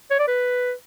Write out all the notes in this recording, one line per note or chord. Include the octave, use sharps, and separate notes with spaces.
C#5
D5
B4